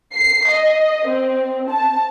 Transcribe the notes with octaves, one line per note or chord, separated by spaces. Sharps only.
C7
D#5
C4
A5